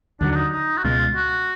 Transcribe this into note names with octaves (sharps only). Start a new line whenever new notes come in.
D#2 D3 F#3 D4
D4
D#4
D#4
F#4
C#2 B2 G#3 F4
F#4